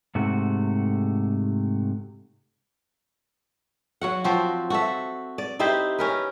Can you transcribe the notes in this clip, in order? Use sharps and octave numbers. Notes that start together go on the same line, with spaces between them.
G#2 C3 A3 F#4
F#3 F#4 F#5
F3 C4 F#4
F#4 A4 E5
D5
D#4 E4 G4 C5
C#4 A#4 B4